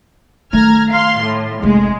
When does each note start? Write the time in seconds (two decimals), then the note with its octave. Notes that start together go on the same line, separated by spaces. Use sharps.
0.53 D#3 A3 A#5 F6 G#6
0.91 F5 C6
1.21 A2
1.62 F1 G#3 A3